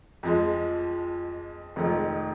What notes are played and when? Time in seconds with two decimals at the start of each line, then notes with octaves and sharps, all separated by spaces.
0.23 F2 F3 G#3
1.76 F1 F2 D#3 G#3 D#4